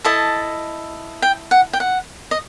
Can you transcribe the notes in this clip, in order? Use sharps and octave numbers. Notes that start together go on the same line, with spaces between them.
E4 A4 D#5 A5
G5
F#5
G5
F#5
D#5